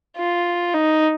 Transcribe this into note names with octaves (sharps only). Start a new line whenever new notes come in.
F4
D#4